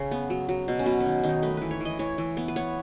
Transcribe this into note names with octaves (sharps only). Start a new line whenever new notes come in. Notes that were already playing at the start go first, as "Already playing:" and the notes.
Already playing: C#3 C#4
B3
F#3
F#3
B2
C#4
F#3 B3
C#4
D#3
D#3 D#4
A3 B4
E3 B4
C#5
E3 D#5
E3 C#5
E3
B3
B4
B3 C#5